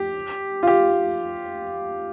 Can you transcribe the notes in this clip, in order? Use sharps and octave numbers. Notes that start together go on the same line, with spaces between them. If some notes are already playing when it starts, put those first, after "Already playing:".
Already playing: G4
F4
G4